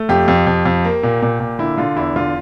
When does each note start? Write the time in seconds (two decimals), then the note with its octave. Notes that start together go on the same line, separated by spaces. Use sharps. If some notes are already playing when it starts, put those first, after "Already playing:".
Already playing: A3
0.09 F2 G4
0.28 F2
0.47 F2
0.66 F2
0.84 A#3
1.03 A#2
1.22 A#2
1.40 A#2
1.59 D3 E4
1.77 D3 F4
1.96 E2 E4
2.16 D3 F4